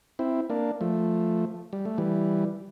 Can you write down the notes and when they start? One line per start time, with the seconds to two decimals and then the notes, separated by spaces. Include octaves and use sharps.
0.19 C4 E4
0.50 A#3 D4
0.81 F3 A3
1.73 G3
1.85 A3
1.98 E3 G3